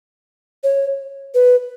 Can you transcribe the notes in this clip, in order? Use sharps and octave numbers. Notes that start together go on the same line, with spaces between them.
C#5
B4